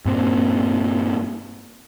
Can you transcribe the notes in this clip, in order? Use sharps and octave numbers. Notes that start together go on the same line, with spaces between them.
G2 A#2 C4